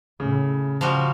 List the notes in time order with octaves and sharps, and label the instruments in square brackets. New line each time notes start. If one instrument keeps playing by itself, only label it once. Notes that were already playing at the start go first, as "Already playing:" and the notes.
[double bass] A2 [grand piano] C#3
[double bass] C#3 [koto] F3 G3 F#4